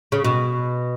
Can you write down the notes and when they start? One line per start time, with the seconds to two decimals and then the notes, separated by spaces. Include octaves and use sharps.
0.12 C#3
0.24 B2